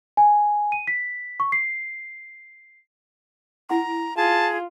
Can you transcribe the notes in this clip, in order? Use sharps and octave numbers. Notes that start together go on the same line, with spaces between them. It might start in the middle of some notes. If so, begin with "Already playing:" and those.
G#5
D#7
B6
C#6
C7
E4 F#5 A#5 C6
F4 G#4 A5